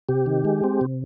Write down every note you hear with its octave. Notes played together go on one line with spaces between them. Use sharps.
C3 G4
D#3
G#3
C4
C3